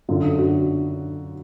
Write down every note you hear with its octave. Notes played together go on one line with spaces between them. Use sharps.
F#2 D3 F#3 F4
F#4